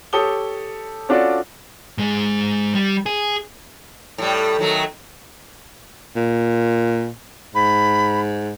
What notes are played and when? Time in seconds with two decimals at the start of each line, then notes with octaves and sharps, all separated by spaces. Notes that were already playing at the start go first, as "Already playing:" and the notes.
0.13 G4 A4 C#5 D#6 G7
1.09 C#4 D4 F4 F#4 A4 D5
1.98 G#2 G#3
2.75 G3
3.06 G#4
4.18 A2 G3
4.59 D#3 F#3 A3
6.16 A#2
7.55 G#2 B5